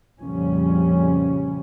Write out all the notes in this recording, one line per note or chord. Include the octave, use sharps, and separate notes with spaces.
F2 A#2 C#3 F3 G3 C#4